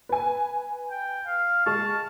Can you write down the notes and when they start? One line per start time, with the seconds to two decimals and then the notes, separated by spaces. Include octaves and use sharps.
0.09 B4 G#5
0.90 G5
1.26 F5
1.66 G#3 A5 C#6 F6